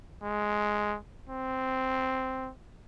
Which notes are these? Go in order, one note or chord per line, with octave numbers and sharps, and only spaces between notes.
G#3
C4